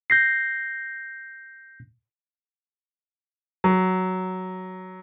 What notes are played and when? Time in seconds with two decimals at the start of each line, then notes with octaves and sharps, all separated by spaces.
0.10 G6 A#6 C7
3.64 F#3